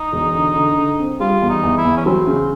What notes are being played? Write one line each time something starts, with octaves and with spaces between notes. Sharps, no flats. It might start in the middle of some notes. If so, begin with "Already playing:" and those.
Already playing: D#4
E1
D3
D3
D3
C4
G3 F4
E2
D#4
E2
E4
E2
C#4
F#3 C4
C#3